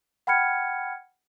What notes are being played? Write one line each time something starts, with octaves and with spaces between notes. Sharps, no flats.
F#5 G5 B5 F6 G#6 C#7